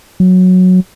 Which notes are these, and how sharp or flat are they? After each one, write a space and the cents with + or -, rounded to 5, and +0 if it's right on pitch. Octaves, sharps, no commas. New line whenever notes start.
F#3 -10